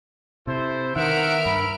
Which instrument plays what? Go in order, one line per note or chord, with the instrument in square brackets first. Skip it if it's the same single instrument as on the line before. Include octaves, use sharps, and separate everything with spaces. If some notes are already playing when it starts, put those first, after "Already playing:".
[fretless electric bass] C3 [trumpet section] E4 C5 [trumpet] A4
[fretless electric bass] D#3 [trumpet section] B3 E5 [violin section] A#4 F6 D7 [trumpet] F#5
[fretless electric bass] G2 [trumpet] B5